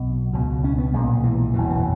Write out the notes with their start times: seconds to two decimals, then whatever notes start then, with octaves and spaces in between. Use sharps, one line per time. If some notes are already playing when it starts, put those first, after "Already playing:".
Already playing: B1 B2
0.33 C#2 B2
0.64 C#4
0.78 B3
0.93 B1 A#2 G#3
1.24 E3
1.54 F#1 E2 B2 E3
1.70 E3